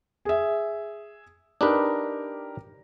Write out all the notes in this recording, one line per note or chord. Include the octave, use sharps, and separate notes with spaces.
G#4 E5
D4 D#4 G4 A#4 B4